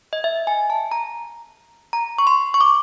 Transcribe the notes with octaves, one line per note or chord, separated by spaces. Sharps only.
D#5
E5
G#5
A5
A#5
A#5
C#6
C6
C#6
D6